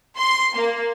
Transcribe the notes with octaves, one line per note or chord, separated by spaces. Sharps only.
C6
A#3